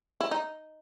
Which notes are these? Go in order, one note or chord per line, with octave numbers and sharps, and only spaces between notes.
E4
D#4